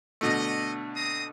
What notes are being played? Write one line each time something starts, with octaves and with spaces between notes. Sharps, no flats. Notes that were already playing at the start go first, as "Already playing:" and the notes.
B2 D3 A3 D#5
C4 A#5 D#6